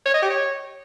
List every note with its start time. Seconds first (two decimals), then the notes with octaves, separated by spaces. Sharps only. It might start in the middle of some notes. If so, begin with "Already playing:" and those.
0.06 C#5
0.14 D#5
0.22 G4
0.30 C#5